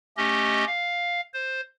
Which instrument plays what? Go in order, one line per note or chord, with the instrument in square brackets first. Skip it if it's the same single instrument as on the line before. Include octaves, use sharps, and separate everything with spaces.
[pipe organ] A3 C#4 G4 D#5
F5
C5